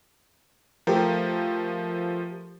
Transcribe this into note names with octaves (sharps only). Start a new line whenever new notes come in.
F3 A3 G4 A#4